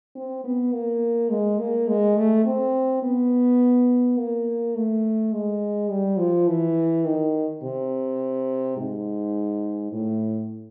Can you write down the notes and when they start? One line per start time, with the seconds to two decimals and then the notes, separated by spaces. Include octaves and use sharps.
0.15 C4
0.44 B3
0.73 A#3
1.30 G#3
1.59 A#3
1.88 G#3
2.17 A3
2.45 C4
3.03 B3
4.18 A#3
4.75 A3
5.33 G#3
5.90 G3
6.18 F3
6.48 E3
7.05 D#3
7.63 C3
8.77 G#2
9.92 A2